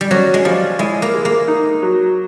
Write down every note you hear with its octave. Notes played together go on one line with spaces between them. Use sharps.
G3
F#3 C#4
G#3
F3 G3
G#3 E4
A#3
G#3
A#3
D#4
F#3